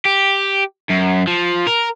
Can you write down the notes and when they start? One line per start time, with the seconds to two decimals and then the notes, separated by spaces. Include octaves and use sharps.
0.05 G4
0.89 F#2
1.27 F3
1.67 A#4